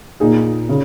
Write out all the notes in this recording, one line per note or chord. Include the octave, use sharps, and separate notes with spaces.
A#2 A#3 D#4 G#4
C#3